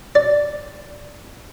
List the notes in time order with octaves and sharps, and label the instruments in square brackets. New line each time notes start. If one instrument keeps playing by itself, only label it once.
[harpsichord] D5